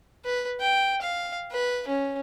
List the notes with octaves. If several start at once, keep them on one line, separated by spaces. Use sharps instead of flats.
B4
G5
F5
B4
C#4